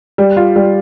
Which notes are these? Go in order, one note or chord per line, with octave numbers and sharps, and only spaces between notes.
G3
F4
G3